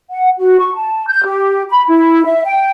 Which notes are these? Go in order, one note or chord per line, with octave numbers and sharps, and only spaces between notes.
F#5
F#4
C#6
A5
G6
G4
B5
E4
E5
G5